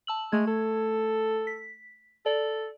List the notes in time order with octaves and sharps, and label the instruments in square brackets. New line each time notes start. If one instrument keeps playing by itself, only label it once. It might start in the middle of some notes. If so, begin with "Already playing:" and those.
[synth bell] A5 E6 F#7
[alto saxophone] G#3 [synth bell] A3 G#6
[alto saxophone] A4
[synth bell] B6
[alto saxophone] A4 [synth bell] D5